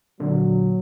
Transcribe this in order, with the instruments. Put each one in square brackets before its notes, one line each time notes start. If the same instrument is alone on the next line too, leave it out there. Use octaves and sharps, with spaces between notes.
[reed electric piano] A#2 D3 [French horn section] F#3